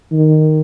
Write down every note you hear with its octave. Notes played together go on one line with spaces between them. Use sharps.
D#3